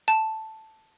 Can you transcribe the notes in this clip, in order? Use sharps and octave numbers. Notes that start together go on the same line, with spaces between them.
A5